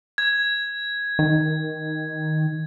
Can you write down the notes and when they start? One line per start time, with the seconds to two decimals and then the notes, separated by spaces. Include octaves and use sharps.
0.18 G#6
1.19 D#3